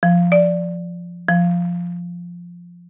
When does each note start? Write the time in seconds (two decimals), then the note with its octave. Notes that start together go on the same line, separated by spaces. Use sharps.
0.03 F3
0.32 D5
1.29 F3